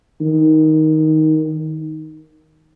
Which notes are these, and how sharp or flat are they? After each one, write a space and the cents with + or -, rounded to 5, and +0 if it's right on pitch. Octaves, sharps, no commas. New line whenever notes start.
D#3 +5